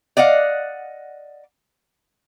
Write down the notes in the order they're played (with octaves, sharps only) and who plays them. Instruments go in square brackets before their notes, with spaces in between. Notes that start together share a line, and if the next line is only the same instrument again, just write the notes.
[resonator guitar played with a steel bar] D5 D#5 F5 F#5